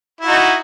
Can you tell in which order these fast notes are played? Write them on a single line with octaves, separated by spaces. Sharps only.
E4 F#4 D#4